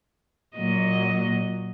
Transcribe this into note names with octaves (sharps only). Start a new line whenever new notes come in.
A#2 F#3 D#5